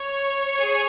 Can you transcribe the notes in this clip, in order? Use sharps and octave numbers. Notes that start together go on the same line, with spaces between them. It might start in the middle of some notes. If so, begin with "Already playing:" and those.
Already playing: C#5
G#4